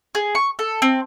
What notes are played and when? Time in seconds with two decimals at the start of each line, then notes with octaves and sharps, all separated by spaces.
0.15 G#4
0.35 C#6
0.59 A4
0.82 C4